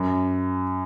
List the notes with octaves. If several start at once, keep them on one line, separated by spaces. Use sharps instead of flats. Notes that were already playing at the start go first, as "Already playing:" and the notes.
Already playing: F#2